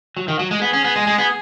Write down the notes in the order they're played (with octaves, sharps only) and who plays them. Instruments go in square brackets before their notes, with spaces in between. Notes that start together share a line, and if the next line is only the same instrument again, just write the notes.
[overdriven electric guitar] F#3
D#3
F#3
G#3
[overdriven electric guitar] B3 [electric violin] G#4
[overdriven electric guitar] C#4
B3
G#3
G#3
B3